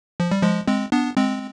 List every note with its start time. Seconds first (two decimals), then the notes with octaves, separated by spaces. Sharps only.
0.20 F3
0.32 G3
0.43 F3 G#3
0.67 G#3 C4
0.92 B3 D4
1.17 G#3 C4